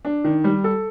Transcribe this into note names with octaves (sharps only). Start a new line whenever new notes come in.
D4
D#3
G3
A4